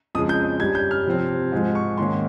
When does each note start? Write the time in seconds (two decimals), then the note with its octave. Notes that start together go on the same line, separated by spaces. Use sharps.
0.15 F2 C#3 F3 G#3 D#6
0.29 G6
0.60 G2 G3 C#4 G#6
0.75 G6
0.91 F6
1.07 C3 F3 C4
1.52 G#2 F3 G#3
1.75 C#6
1.97 G#2 D#3 A#3 C#4 C6